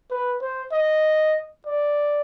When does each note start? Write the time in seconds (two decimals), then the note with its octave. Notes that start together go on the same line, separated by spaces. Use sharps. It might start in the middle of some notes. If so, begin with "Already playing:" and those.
0.10 B4
0.41 C5
0.72 D#5
1.66 D5